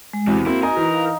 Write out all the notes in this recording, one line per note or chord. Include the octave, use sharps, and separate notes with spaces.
G#3
E2 C3 C4 F#4
A#3 C4 E4
D#4 A#4 G#5
E3
F5